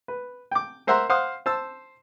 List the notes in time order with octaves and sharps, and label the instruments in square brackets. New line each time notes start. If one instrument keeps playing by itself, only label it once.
[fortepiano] B4
G5 D6
A#4 C5 E5 F#5 A#5 C6
C5 F5 F#5 C6 D#6
C5 A5 E6